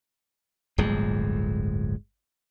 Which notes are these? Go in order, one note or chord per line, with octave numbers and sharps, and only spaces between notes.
D1 G1 F2 G#3